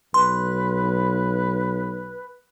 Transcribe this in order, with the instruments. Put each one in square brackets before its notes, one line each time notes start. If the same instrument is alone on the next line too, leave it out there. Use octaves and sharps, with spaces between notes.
[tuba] B1 [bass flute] B4 [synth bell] C6